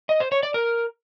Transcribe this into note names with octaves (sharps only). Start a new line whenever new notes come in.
D#5
C5
C#5
D5
A#4